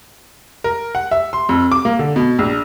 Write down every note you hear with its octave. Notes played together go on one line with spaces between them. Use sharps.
A#4
F#5
E5
C6
F2
D6
A#3
D3
B2
A#1